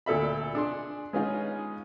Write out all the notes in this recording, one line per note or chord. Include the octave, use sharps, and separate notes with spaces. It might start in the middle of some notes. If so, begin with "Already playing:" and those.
D2 A#2 A4 E5 B5
D4 G#4 C6
G#3 B3 C#4 D#4 F4 G#4